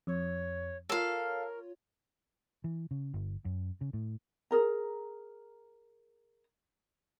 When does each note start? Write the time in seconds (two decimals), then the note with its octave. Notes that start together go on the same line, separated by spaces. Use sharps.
0.07 F2 C#5
0.89 F4 A4 A#4 C#5 F5
2.64 E3
2.91 C#3
3.14 G1
3.45 F#2
3.81 C#3
3.93 A2
4.51 G#4 A#4 A#5